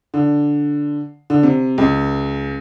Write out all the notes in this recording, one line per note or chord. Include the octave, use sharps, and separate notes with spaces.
D3
D3
C3
C#2